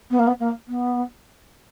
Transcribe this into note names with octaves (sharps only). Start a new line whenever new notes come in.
B3
A#3
B3
A#3
B3